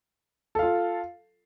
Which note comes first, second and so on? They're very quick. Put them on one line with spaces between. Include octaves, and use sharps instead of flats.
A4 F5 F4